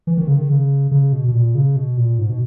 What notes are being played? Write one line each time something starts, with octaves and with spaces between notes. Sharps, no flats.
E3
D#3
C#3
D#3
C#3
C#3
B2
B2
A#2
C#3
B2
A#2
G#2
B2